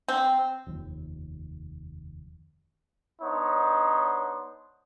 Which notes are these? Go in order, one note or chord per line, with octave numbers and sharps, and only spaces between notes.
C4
F1 D#2
B3 D4 D#4 C5 C#5